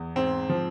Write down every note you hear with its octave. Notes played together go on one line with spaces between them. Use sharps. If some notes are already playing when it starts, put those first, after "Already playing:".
Already playing: E2
G#2 C4
F3